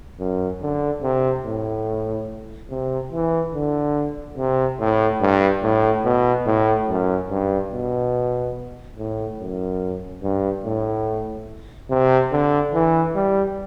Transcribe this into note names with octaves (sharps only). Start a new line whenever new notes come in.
F#2
D3
C3
A2
C3
E3
D3
C3
A2
G2
A2
B2
A2
F#2
G2
B2
A2
F#2
G2
A2
C3
D3
E3
G3